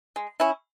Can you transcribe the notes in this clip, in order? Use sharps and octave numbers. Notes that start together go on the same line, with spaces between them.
G#3
C#4 E4